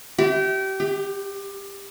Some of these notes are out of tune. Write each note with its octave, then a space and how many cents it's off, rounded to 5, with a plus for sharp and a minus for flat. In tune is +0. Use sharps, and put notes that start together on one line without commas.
G4 -30
G4 +20